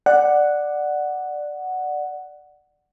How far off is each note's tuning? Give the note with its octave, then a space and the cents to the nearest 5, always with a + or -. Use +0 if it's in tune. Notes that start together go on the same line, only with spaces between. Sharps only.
D5 +10 F#5 +0